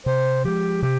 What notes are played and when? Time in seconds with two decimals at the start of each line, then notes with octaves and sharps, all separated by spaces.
0.06 C3 C5
0.44 F3 G#3 G4
0.82 C3 G4